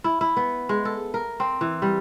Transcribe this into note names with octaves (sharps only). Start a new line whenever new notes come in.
E4
E4
B3
G#3
A4
A#4
C4
E3
G3